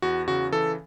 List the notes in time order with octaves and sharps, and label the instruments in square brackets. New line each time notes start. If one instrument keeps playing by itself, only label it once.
[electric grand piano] E2 F#4
C#3 F#4
E3 A4